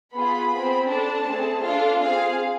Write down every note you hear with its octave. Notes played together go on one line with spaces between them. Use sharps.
B3 F4 G#4 B5
C4 G#4
D4 A4 A5
A3 C4 G#4
D4 F4 A4 F5
C4 G#4 F5